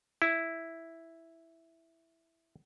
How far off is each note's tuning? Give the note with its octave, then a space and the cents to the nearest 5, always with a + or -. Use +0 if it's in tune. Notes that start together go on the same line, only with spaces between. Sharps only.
E4 +0